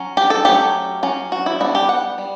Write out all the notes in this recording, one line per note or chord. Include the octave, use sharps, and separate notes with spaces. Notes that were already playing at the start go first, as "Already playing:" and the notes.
Already playing: F#3 C#4
G4
A4
F#3 A3 C#4 G4
F#3 C#4
F#4
E4
G3 B3 D4 F#4
G4
F#5
G3